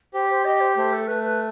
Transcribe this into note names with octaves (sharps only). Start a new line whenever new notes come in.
G4 C5
C5
G4 D#5
C5
A3 C5
A4
A3 B4
B4